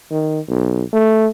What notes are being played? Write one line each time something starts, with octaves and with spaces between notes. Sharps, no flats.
D#3
B1
A3